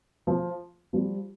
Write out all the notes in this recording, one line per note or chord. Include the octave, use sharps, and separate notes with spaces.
F3
F3 G3